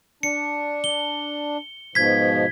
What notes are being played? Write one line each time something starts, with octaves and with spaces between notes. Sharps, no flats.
D4 C#7
G7
G#2 B2 F3 G#6 B6